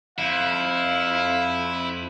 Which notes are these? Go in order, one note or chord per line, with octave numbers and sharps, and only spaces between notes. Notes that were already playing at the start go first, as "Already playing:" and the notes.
F2 E4 F5